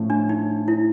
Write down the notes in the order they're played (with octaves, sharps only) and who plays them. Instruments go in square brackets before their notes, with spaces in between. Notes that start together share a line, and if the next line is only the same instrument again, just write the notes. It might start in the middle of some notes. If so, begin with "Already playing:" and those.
Already playing: [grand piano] A2 F3 A3 C#4
[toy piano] D4
D#4
E4